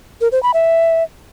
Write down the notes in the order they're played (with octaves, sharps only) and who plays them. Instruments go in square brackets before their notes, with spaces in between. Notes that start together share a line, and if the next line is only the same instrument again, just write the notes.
[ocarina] A#4
C5
B5
E5